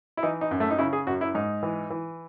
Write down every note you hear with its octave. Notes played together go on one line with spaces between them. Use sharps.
E4
E3 D#4
D#4
F#2
A3
D#4
C#3 E4
G#4
F#2 F#4
E4
G#2 D#4
E3
E3